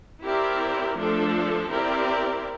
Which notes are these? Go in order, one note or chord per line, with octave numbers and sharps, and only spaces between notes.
C4 E4 G4 A#4 D5
F3 A3 D4 A4
C4 E4 G4 A#4 D5